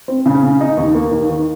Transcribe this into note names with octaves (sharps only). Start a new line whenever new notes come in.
C4
C#3
C#3
D#4
D#2
A#3
D#2
D#3